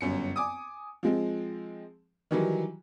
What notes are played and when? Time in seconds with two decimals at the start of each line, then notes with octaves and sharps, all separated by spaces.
0.01 G1 F#2 C#7
0.36 G#5 D6 D#6
1.03 F3 G#3 C4
2.31 D#3 E3 F#3 G3